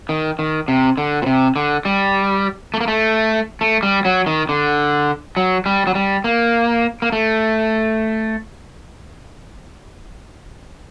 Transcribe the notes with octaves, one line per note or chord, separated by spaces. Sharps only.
D#3
D#3
C3
D3
A#2
C3
D3
G3
A3
A#3
A3
A3
G3
F#3
D#3
D3
F#3
G3
F#3
G3
A#3
A#3
A3